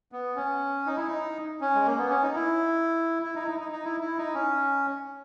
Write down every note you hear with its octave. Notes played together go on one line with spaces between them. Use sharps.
B3
C#4
D#4
E4
D#4
C#4
G#3
A#3
B3
C#4
D#4
E4
E4
D#4
E4
D#4
D#4
D#4
E4
E4
D#4
C#4